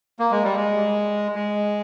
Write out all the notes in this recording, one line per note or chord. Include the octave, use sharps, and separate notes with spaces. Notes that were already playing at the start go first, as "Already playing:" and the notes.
A#3
G#3
G3
G#3
G#3